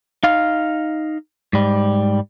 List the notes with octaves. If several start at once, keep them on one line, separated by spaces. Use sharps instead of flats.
D#4 F5
G#2 G3